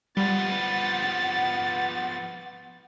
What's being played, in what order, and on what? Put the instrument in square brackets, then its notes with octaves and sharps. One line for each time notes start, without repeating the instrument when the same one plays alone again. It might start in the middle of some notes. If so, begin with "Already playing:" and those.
[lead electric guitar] F3 B3 [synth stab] G3 [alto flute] F#5 [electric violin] A6